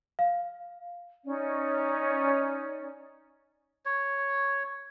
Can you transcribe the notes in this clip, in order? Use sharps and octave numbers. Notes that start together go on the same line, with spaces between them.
F5
C#4 D#4 D5
C#5